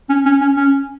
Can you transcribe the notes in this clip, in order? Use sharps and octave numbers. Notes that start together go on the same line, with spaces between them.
C#4
C#4
C#4
C#4